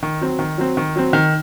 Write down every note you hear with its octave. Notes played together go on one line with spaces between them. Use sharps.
D#3
F#3 C4
D#3
F#3 C4
D#3
F#3 C4
D#3